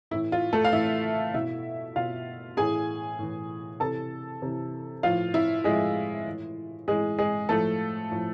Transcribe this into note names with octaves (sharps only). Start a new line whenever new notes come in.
A2 E3 E4
F4
A3 A4
F5
A2 E3 E4 E5
B2 E4 E5
B2 F4 F5
A2 E3 G#4 G#5
A2 E3
C3 E3 A4 A5
C3 E3
A2 F3 F4 F5
E4 E5
A2 F3 G#3 G#4
A2 E3
A2 E3 G#3 G#4
G#3 G#4
A2 F3 A3 A4
A2 F3